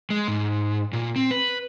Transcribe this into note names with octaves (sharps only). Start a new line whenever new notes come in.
G#3
G#2
A#2
C4
B4